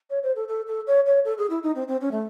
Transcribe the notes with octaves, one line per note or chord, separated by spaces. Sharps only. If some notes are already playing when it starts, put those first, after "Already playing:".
C#5
C5
A4
A4
A4
C#5
C#5
A4
G#4
E4
D#4
C4
C4
C#4
A3